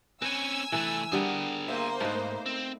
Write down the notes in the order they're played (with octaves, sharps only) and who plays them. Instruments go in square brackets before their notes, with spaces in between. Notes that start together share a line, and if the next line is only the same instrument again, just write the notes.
[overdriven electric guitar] C4 C#4 [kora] B4 [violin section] G#5 E6
[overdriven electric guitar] C2 A3 [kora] E3 B4
[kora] D3 G3 B3 [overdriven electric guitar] G#4 A#4
[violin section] A#3 C5 [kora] E5
[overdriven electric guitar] G#2 [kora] A3 D#4 B4
[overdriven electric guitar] C4